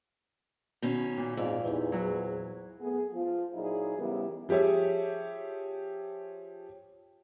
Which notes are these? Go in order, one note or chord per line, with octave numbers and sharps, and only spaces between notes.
B2 D#3 C#4
A#2
F2 G#2 D5 F5
E2 D#4 E4 G4
F#3 E4 F#4 G#4 C5
A3 B3 G#4
F3 F4
A#2 F#3 D#4 E4 G#4 C5
C#3 E3 G3 B3 E4 A#4
F3 G4 G#4 C#5 E5